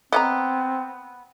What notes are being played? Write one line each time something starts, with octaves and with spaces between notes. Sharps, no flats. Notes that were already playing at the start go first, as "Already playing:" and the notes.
B3 C4 D#5 F#5 A#5